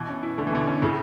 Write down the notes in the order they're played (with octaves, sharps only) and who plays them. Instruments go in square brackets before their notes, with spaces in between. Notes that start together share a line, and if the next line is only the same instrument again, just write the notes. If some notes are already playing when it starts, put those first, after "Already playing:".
Already playing: [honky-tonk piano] B2 [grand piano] E3
[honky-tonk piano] C#4
E4
[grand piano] D3 [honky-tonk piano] A3
[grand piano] E3
[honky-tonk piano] B2 [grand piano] D3
[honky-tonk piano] C#4
[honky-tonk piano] A2 [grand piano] C#3